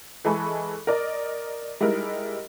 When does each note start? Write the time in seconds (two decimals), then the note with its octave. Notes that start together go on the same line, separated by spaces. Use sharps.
0.25 E3 G#3 A4 G#5 B5 C#6
0.87 A#4 D5 D#5
1.81 G3 G#3 D#4 E4 A#4